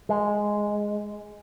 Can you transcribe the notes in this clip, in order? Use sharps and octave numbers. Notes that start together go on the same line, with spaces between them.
G#3